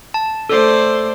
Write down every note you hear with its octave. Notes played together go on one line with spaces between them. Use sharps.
A5
A3 A4 C5 D5